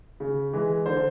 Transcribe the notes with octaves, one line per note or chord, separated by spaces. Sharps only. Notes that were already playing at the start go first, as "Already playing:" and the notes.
C#3
E3 G#3
D3 C5